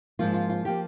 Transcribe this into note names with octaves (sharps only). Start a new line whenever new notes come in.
G#2 F3 A#3 F4
F4
F4
F3 A#3 G4